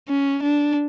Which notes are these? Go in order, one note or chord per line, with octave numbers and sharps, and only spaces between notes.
C#4
D4